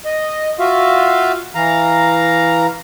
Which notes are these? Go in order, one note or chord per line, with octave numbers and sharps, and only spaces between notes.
D#5
F4 F#4 E5 F5
E3 F5 A#5